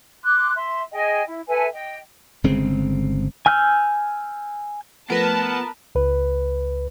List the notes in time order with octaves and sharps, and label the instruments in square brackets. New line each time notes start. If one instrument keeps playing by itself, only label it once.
[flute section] C6 D6 F#6
E5 C6
G#4 D#5 G5 G#5
E4
A4 B4 E5 G#5
D#5 G5
[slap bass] G1 C#3 G#3 C4
[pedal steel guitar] G#5 E6 F6 G6
[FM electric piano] F3 A3 A6 [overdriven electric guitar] B3 [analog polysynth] A#4 B4 [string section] A5
[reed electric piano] C#2 B4